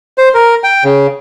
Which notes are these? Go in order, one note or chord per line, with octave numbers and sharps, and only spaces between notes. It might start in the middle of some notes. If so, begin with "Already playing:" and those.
C5
A#4
G5
C#3